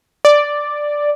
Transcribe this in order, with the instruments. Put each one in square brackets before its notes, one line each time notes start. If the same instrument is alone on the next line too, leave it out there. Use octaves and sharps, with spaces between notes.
[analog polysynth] D5